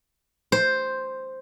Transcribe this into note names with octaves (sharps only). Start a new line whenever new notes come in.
C5